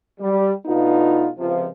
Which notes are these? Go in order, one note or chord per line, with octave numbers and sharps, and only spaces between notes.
G3
B2 A3 B3 D4 D#4 F4
C#2 C3 F3